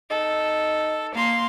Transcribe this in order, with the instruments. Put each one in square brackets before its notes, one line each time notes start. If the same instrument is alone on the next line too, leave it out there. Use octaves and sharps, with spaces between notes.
[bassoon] D#4 [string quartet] A4
[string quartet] A#3 F5 C6